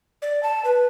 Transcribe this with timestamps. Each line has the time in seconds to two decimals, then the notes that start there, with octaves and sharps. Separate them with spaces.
0.22 D5
0.43 A5
0.65 B4